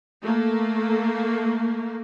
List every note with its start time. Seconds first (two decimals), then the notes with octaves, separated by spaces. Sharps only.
0.23 A3 A#3